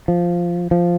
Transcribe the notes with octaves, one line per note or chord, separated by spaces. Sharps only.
F3
F3